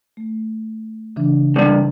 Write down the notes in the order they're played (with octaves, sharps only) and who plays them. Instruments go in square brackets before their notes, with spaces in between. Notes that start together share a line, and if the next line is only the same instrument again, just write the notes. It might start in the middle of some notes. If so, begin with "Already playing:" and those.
[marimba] A3
C#3 E3 D4
[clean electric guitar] C2 G2 [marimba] G6